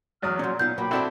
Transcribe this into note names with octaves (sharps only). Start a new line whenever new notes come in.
E2 F#3 D#6 F6
A#2 F#3 C#4 G#4 C6 G6
B2 B3 D#4 F4 G6
B1 F#3 A#3 G5 B5 D6
C4 D4 E4 F#4 A4 D#5